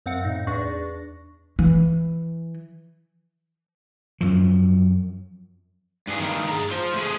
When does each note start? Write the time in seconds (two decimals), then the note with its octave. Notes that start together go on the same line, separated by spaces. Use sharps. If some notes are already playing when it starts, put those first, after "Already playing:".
0.06 F#2 C4 F5 F#5 C#7
0.24 A2 D#4
0.47 E2 D4 D5 C#6 A#6
1.59 E3
4.21 F#2 F3
6.07 G2 G#4
6.20 G2 D#3
6.48 G#4 A#5
6.71 F4 C5
6.94 A3 G#4